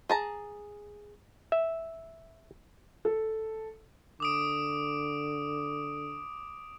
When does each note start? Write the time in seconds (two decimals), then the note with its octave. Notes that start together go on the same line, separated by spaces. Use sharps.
0.10 G#4 A5 A#5
1.52 E5
3.05 A4
4.20 D3 D6 D#6 D7